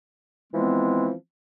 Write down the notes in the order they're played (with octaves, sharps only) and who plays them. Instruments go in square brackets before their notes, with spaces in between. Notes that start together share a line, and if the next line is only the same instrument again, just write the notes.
[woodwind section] E3 F3 G#3 B3 C4